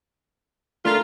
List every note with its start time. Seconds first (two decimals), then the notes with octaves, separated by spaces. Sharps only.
0.85 A3 D4 F4 A#4